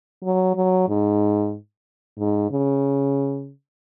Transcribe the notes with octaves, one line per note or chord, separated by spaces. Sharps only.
F#3
F#3
G#2
G#2
C#3